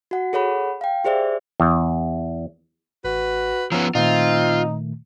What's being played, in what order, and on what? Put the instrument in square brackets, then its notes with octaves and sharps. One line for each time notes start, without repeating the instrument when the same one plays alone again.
[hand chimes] F#4 F#5
G#4 A4 C#5 F#5 B5
F5 G5
G4 G#4 C5 D5 E5
[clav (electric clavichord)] E2
[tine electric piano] A1 [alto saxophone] F#4 [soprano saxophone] B4
[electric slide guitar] F3 B3 [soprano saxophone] C#4 [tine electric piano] A#5 E6
[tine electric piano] A#2 D#3 A3 [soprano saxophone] C4 [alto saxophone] D#4 [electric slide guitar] F4